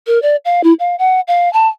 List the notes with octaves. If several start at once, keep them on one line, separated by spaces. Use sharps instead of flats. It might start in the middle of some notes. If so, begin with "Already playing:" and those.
A#4
D5
F5
E4
F5
F#5
F5
A5